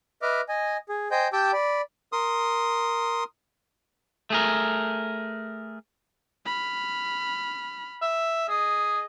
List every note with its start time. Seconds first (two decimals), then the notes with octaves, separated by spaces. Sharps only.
0.22 B4 D#5 E5 D6 F6
0.49 D#5 G#5
0.89 G#4
1.11 C5 D#5 G5 G#5 G6
1.33 G4 G5 A5 D6 E6 G6
1.53 D5 B5
2.12 A#4 C6 D#6
4.30 A3 G#4 A#4
6.46 B5 F6
8.02 E5
8.49 G#4 D#5